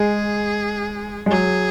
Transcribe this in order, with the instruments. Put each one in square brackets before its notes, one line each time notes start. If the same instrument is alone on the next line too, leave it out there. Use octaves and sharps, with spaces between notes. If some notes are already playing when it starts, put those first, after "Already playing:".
Already playing: [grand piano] G#3 [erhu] G#4
[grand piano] G#3
[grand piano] F#3 [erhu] G#4